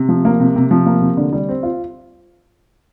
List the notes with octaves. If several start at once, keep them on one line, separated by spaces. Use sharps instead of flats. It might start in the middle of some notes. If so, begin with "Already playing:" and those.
Already playing: C3
F3
A#3
C3
C3
F3
A#3
C3
D3
G3
C4
F4